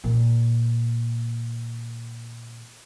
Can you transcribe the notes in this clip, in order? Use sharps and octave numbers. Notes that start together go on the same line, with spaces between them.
A#2 D#3